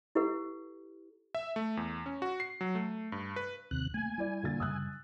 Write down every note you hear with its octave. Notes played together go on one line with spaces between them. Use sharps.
E4 G4 A4 B4 F#5
E5
A3
E2
C#4
F#4
C7
F#3
A3
G2
B4
D#2 C3 F#6
A3 A#3 G#5
G3 E4 D5
A#2 D3 A6
F#2 C#3 G3 D#6 E6 F#6